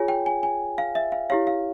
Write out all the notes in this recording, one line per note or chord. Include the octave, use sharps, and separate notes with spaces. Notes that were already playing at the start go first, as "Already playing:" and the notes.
Already playing: F4 G#4 C#5 G#5
G5
G#5
G#5
F5
E5
F5
E4 G4 C#5 F5
F5